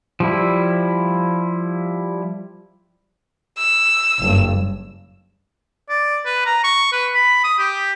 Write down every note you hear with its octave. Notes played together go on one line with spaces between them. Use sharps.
F3 G3 E4
E6
F#1 G2
D5
B4
A#5
C#6
B4
B5
D#6
G4